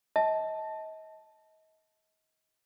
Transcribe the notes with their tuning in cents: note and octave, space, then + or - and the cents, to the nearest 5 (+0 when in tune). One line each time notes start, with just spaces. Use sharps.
D#5 +35 A5 -10